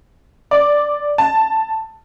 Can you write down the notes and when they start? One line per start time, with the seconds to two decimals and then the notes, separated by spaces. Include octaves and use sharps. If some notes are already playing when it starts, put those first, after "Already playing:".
0.51 D5
1.18 A5